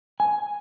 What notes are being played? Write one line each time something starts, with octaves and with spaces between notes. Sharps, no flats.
G#5